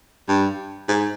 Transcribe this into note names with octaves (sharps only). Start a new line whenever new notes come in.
G2
G#2